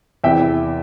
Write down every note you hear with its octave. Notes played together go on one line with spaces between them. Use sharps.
E2 C3 E3 E5 G5